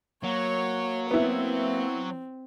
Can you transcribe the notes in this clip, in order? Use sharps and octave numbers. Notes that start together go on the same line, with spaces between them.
F#3 A#3 C#5
B3 C4 E4